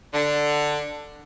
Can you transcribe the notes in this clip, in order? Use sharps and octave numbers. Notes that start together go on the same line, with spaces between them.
D3